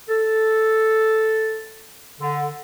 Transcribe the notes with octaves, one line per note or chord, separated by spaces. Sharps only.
A4
D3